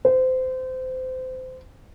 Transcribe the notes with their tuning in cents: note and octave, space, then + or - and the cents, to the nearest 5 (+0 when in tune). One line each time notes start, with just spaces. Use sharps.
C5 -25